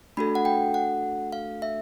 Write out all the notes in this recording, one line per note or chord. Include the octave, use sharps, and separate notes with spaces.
A3 D4 F#4 A4 B5
F#5
G5
F#5
F5
E5